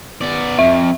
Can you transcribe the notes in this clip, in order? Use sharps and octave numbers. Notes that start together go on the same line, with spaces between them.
B3 D5
F2 E5